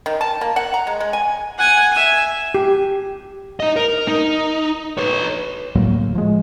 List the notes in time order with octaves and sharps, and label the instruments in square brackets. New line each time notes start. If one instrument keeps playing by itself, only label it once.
[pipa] D#3
A5
A#3
F#5
A#5
G#3
G#3
G#5
[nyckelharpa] F#5 G#5
E5 G#5
[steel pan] G4
[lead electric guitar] D#4 D#5
A#4
D#4
B4 C#5
[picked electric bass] D2 A2 F#3 A#3
F3 G#3